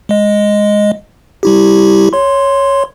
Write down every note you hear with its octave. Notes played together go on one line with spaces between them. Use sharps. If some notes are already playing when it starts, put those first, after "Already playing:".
G#3 D#5
G3 E4 G4
C#5 C6